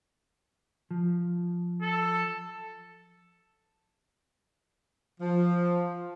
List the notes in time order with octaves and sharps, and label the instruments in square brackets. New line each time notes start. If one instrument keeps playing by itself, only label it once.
[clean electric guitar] F3
[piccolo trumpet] A4
[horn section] F3